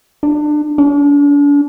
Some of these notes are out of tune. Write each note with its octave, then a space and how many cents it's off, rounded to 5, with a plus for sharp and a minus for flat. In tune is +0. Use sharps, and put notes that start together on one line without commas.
D4 +25
D4 -40